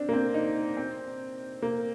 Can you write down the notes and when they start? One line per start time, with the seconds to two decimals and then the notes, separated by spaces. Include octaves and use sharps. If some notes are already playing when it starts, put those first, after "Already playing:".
Already playing: C4 D4
0.09 A#3
0.13 C4
0.34 D#4
0.77 C4
1.62 A#3